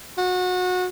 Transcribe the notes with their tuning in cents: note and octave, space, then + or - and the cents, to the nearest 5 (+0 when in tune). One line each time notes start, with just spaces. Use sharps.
F#4 -25